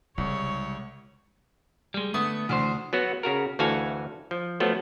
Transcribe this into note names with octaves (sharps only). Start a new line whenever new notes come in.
C2 C#3 G#3 C#5
G3 G#3
D3 A3 B3 D#6
D2 E3 D4 C5
F#3 B3 F#4
C#3 F#4 A#4
D2 E3 F#4 A4 F5 G#5
F3
F3 F#3 A3 B3